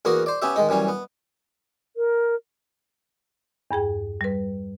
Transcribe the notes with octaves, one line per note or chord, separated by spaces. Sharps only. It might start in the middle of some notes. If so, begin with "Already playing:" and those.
E2 A#3 B3 F#4 A#4
C5 D5
B3 C#4 G4 E5
D#3 G#3 D#4
F#2 E3 G3 C#4
B3
A#4
E2 G2 G#4 G5
G3 B4